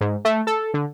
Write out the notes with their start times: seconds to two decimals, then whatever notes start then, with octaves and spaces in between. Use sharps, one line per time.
0.01 G#2
0.25 A3
0.47 A4
0.74 D3